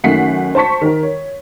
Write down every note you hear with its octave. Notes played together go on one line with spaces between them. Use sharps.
F#2 D#3 A3 F#5 B6 C7
C5 A5 C#6 B6
D#3 A#4
C#5